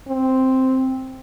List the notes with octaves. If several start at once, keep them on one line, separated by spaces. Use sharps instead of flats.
C4